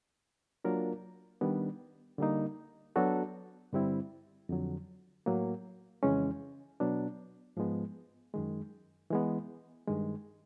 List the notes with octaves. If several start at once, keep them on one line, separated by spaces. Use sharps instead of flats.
F#3 A#3 D4 F4 A#4
D#3 G3 B3 D4
D3 G3 A#3 D#4
F#3 B3 D4 F#4 A4
G2 D3 G3 C4 E4
F2 D3 F#3
A2 F#3 A#3
F2 C#3 E3 G#3 C#4
B2 F#3 B3 D4
G#2 F3 G#3 B3
F#2 D#3 G#3
E3 G#3 B3
G2 D#3 G#3